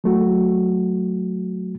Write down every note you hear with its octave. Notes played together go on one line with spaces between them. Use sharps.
F#3 A3 F#4